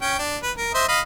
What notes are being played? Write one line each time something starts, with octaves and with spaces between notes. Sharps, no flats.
C#4 G5
D4
B4
A#4
C5 D#5 E5
D#5 F5 B5